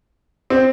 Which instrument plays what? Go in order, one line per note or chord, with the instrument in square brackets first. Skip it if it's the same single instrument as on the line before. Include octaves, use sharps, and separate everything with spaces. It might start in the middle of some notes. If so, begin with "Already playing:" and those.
[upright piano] C4